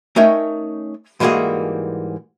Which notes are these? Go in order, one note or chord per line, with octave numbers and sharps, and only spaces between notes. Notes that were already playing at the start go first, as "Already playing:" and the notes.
A3 C#4 D#4 A#4 C#5 G5
G#2 E3 G3 A#3 F#4 G#4